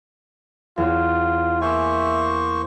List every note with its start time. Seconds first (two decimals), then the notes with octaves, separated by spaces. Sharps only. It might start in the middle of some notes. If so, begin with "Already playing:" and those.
0.78 E2 F4 C#5
1.62 A#3 C5 E5 G#5 C#6 E6